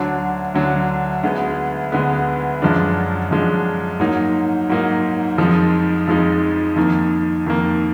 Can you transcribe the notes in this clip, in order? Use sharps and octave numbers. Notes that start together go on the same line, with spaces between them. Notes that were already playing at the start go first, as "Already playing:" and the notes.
Already playing: D2 D3 F#3 D4
D2 D3 F#3 D4
D2 D3 G#3 B3
D2 D3 G#3 B3
F#2 F3 G#3 D4
F#2 F3 G#3 D4
G#2 F#3 A#3 D#4
G#2 F#3 A#3 D#4
F2 F3 G#3 D#4
F2 F3 G#3 D#4
F2 D#3 A#3
F2 D#3 A#3